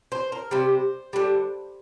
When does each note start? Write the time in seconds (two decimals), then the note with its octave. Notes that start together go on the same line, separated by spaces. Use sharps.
0.12 C5
0.32 A#4
0.51 C3 G3 C5
1.13 D3 G3